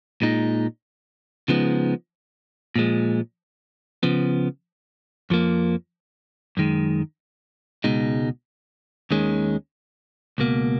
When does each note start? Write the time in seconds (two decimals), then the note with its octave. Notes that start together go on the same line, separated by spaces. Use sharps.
0.22 A#2 G#3 D#4
1.48 C#3 F3 G#3 B3 D#4
2.76 A#2 F3 G#3
4.03 C#3 F3 B3
5.30 F2 F3 A#3
6.57 F#2 D#3 G#3
7.84 C#2 B2 G#3 D#4
9.11 D#2 D#3 G#3 C#4
10.38 C#2 B2 A#3